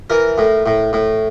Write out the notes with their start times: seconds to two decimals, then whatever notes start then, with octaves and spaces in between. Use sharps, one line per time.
0.10 E3 A#4
0.38 A2
0.66 A2
0.93 A2